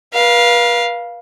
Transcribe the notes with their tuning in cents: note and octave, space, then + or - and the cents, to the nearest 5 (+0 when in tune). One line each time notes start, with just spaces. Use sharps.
B4 -40 F5 +0